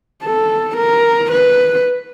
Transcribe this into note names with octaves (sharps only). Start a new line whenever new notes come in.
A4
A#4
B4